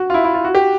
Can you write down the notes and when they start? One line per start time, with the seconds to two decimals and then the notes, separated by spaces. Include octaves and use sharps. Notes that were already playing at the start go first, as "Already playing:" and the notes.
Already playing: F#4
0.10 F4
0.14 E4
0.24 E4
0.34 F4
0.45 F#4
0.55 G4